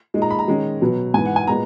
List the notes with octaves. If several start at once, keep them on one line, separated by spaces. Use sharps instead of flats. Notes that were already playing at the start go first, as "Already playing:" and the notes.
A#2 G#3 D#4
A#5
B5
A#5
D#3 G#3 C#4
B2 F#3 B3
G#2 E3 B3 G#5
F#5
G#5
A#2 G#3 B3 A#5